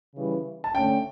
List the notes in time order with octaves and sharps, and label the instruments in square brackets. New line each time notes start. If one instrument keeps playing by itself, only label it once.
[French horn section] C#3 E3 G3
[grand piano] A5
[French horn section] D3 A3 C#4 [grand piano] G5